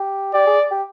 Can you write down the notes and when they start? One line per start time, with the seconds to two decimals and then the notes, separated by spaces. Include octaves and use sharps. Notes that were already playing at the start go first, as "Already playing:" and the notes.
Already playing: G4
0.34 G4 D5
0.47 G#4
0.71 G4